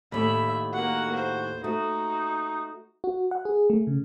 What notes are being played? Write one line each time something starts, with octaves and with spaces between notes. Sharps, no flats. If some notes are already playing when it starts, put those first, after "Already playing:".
D#2 A2 A4 E5 B5
A#3 F#4 F#5
C5
A3 D#4 F#4
F#4
F#5
G#4
A3
C#3